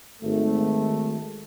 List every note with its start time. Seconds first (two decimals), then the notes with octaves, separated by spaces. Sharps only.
0.22 G#1 A3